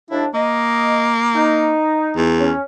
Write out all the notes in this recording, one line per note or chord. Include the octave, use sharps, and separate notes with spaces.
D#2 D4 E4
A#3 D#5
D#4
E2
C#4